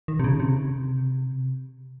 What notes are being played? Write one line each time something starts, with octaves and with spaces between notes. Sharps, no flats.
D#3
C3
C#3
C3